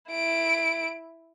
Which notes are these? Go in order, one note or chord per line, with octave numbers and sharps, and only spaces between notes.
E4 D7